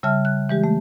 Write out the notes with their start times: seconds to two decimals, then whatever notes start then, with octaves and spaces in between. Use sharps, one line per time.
0.03 C#3 G3 E5 A5 F6
0.25 F#6
0.49 E3 G#3 G4
0.64 A3